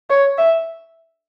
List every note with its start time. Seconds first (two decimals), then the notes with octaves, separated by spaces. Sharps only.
0.10 C#5
0.38 E5